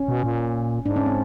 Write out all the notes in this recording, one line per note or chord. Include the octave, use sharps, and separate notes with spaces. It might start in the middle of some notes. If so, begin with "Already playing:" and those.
Already playing: C#4
B2
A#2
G#2 D4
C#4
C4